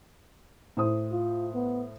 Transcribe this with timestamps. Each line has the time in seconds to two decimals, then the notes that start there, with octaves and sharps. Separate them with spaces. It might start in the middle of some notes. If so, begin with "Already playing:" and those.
0.77 A2 C5 D#6
1.12 F4
1.54 B3